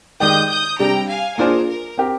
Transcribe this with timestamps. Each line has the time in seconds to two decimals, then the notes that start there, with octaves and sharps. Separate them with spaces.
0.20 D#3 G#3 D#4 G4 D5 D#6 G6
0.49 D#6 G6
0.79 C3 G3 D4 G5 A#5
1.09 F5 G#5
1.38 A#3 D4 F4 G#4 A#4 C5
1.68 A#4
1.98 C4 G4 A#4